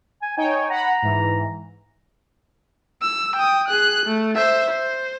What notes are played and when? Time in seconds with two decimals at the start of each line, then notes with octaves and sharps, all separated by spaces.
0.22 G#5
0.37 D#4 C#5 G5 G#5
0.70 F#5 A#5 B5
1.03 G#2 E3
3.02 E6
3.36 G5 D#6
3.68 G#4 F#6
4.06 A3
4.35 C5 E5
4.70 C5